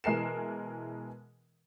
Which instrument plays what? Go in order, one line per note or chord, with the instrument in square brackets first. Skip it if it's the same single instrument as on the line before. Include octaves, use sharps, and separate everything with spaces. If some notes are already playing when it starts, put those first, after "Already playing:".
[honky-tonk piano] B2 E3 G#3 A#4 C7 E7